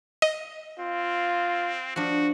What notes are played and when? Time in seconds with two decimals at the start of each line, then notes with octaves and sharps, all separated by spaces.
0.22 D#5
0.79 C4 F4
1.96 F3 D4 F#4